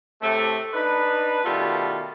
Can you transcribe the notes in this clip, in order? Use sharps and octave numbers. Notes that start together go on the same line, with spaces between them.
A2 C3 A3
D4 D#4 B4
B2 D#3 G3 A3 F4